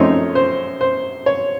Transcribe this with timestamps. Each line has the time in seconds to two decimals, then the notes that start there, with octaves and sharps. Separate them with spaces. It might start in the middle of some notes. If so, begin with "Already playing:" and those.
Already playing: F#2 F3 A3 C4 D#4 C#5
0.35 C5
0.81 C5
1.26 C#5